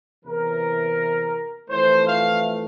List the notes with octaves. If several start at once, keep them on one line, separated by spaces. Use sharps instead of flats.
E2 C3 E3 A#4
F2 E3 A3 C5
F5